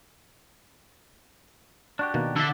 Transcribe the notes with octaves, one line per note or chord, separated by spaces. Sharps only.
D4 F#4 G4
B2 D#3 A#3
D3 A4 E5